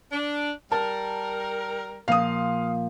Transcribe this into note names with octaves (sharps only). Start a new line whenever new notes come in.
D4
G3 A#4 A5
A#2 F3 F5 D#6